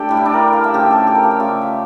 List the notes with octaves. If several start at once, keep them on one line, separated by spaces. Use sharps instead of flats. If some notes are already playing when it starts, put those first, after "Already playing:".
Already playing: A3 D4 G4 A4
A2 G3
E4
D4
A#4
F5
E5
C#3 F3 A3 G4
A4
G4
A#4
F5
E5
C#3 F3 A3 D5
E5